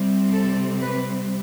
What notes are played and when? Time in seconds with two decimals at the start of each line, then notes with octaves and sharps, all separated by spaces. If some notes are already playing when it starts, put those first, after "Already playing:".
Already playing: C3 G3 C4
0.32 A4
0.80 B4